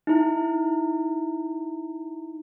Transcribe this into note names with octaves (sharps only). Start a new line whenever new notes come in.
D#4 E4